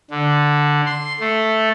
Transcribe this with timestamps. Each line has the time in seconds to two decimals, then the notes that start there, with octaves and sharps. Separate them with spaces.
0.10 D3
0.86 C6
1.20 A3